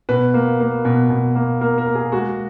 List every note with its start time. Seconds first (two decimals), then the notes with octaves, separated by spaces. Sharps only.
0.09 B2 B4
0.34 A#3
0.60 A#3
0.85 B2
1.10 B2
1.35 A#3
1.61 A#3 A#4
1.78 A#4
1.87 A#3
1.95 G#4
2.12 G#3 F#4